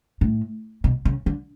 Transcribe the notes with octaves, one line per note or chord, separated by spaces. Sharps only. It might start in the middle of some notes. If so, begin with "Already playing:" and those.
A2
B2
C#3
D3